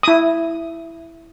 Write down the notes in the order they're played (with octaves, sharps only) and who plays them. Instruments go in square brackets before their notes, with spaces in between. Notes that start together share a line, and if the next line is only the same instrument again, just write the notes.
[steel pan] E4 D#6